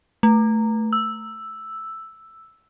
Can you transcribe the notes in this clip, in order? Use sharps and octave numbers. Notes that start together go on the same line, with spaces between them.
A3
E6